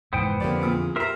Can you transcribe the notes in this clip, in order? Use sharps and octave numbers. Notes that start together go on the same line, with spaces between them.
F1 G#2 E3 B3 C5 G5
F2 D3 A#3 G4 D5
E2 A#2
G4 A#4 C5 E5 A#5